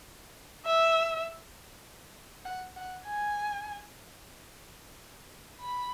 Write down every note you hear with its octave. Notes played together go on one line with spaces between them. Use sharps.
E5
F#5
F#5
G#5
B5